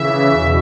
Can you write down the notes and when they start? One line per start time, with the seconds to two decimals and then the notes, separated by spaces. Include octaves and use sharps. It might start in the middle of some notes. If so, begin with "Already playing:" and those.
Already playing: C#3 E3 E5
0.29 E2 B2